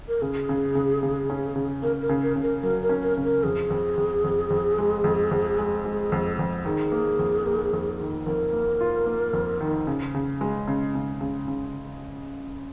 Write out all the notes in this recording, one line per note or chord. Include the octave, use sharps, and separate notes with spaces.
A#4
C#3 G#4
C#3
C#3
C#3
C#4
C#3
C#3 A#4
A#4
C#3
A#4
C#3
A#4
F#3 A#4
A#4
C#4
A#4
C#3
A#4
F2 G#4
F2
F2
F2
F2
G#3
F2
F2
G#3
G#3
F2
F2
D#3 G#4
A#3
F2
A#3
F2
D#3
F2 A#4
A#3
F4
A#3
F2
D#3
C#3
C#3
G#3
C#3
C#3
C#3
C#3